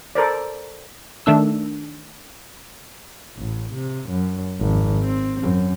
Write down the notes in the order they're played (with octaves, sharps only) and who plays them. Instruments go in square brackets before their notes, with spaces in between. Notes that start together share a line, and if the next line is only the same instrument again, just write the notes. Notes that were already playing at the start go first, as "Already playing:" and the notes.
[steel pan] A4 A#4 C5 D5
[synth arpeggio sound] D#3 A3 D4 E6
[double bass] A1
C3
F#2
G#1 F2
C4
F#2